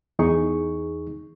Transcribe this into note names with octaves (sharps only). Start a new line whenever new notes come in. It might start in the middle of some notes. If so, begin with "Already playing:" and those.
E2 D#4 G#4 C#6